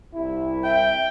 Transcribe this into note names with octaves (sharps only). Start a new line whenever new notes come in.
C2 E4
E5 G5